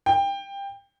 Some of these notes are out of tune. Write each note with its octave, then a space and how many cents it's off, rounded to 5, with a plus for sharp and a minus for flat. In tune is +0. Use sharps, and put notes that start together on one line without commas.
G5 +20